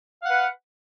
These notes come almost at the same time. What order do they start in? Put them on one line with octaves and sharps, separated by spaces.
F5 F#5 B4